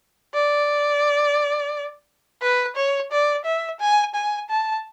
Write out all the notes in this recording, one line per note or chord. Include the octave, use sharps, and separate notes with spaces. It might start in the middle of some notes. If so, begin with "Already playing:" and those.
D5
B4
C#5
D5
E5
G#5
G#5
A5